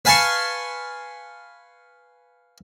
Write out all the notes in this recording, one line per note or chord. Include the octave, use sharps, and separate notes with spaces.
B4 F5 G#5 A5 C6 C#6